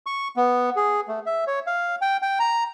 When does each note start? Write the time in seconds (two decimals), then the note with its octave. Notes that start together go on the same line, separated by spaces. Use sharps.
0.06 C#6
0.36 B3
0.76 G#4
1.08 A3
1.26 E5
1.47 C#5
1.67 F5
2.02 G5
2.22 G5
2.39 A#5